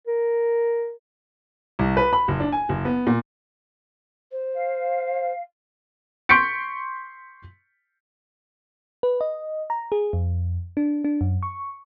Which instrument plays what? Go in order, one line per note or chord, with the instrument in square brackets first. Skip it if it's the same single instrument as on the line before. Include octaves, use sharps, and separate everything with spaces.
[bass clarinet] A#4
[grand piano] C2
B4
B5
F#1
D4
G#5
F#1
B3
A#2
[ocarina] C5
[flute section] F5
[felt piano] C6 C#6 G6 B6 C#7 D7
[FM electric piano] B4
D#5
A#5
G#4
F2
D4
D4
F#2
C#6